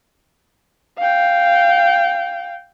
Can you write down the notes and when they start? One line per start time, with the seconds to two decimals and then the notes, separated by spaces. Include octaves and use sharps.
0.99 F5 G5